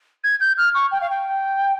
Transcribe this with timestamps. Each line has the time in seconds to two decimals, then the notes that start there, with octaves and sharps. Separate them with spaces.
0.24 G#6
0.40 G6
0.57 F6
0.74 C#6
0.91 G5
1.01 F5
1.10 G5